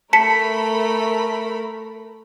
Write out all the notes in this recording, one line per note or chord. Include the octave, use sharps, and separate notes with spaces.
A3 A#4 A5 B5 B6 C#7